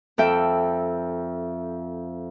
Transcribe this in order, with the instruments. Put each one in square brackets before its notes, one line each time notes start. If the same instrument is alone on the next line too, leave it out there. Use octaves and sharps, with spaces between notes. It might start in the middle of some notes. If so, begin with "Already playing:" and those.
[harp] F2 A4 E5 G5